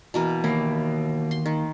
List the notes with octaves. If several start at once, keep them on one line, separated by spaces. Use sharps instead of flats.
B2 E3 A#3
D#2 A#3 E4
C6
D#3